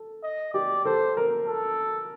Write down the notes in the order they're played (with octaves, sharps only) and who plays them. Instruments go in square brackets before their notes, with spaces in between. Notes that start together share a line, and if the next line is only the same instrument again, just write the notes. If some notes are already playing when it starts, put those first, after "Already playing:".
Already playing: [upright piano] A4
[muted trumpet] D#5
[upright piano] G4 [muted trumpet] D5
[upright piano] A4 [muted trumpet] C5
[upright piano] A#4
[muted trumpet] A4